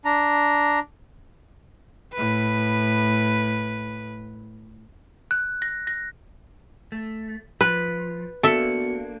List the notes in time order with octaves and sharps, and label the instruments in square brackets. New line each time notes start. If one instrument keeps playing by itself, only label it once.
[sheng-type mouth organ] D4 A#5
[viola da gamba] A2 B4
[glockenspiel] F#6
A#6
A#6
[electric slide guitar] A3
[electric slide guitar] F3 [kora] B4
[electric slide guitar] A#3 D4 [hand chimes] B3 F#4 C#7 [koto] A4 E5